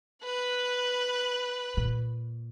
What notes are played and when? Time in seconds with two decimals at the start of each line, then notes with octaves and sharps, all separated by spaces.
0.24 B4 F#6
1.77 A#2